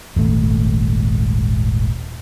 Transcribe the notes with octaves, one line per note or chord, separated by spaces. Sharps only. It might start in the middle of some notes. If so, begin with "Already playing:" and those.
D#1 G#1 A3